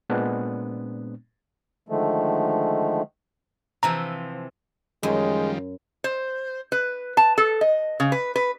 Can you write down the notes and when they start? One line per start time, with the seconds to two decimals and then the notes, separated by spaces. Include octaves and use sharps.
0.09 A#2 G#3 B3 C4 D4
1.89 D3 D#3 F3 G#3 A3
3.83 C3 E3 F3 A#5
5.03 F#2 D#3 F3 G3 G#3
6.04 C5
6.72 B4
7.17 A5
7.38 A4
7.61 D#5
8.00 C#3
8.12 B4
8.36 B4